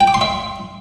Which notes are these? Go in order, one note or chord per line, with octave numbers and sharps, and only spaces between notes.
G5
D6
C6
E5